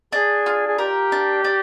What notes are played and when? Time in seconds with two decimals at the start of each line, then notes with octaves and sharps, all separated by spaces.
0.13 D4 G#4
0.46 F4
0.67 G#4
0.78 G4 A#4
1.12 D4
1.44 D4